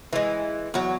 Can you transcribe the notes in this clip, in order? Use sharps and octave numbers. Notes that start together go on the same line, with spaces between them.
E3 G#3
E2 F#3